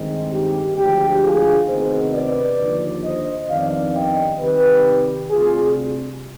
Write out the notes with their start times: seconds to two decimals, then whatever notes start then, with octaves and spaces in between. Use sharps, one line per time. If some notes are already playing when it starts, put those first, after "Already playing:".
Already playing: G2 D#3 G#3 C4 D#4
0.31 G4
0.76 D2 D3 F3 G#3 G4
1.21 F4 G#4
1.67 D2 C3 D#3 B3 D#4 G#4 C5
2.12 B4 D5
2.58 D#2 D3 F3
3.03 C5 D#5
3.48 F2 D#3 G3 B3 D4 D5 F5
3.94 D#5 G5
4.39 C3 D#3 G3 G4 B4
5.30 D2 C3 G3 F4 G#4